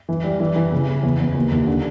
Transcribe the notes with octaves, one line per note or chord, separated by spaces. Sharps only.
E3
G3
E3
E3
C#3
C#3
E2
E2
D#2
D#2
D3